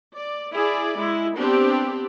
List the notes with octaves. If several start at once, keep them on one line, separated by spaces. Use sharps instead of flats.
D5
E4 G#4 D5
G#3 E4
B3 C4 D4 G4 D5